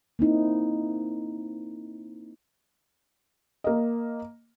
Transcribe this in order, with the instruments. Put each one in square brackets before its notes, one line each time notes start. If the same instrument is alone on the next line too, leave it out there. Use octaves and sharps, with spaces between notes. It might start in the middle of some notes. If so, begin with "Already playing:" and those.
[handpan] A#3 C4 D#4 E4
[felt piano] A#3 D#5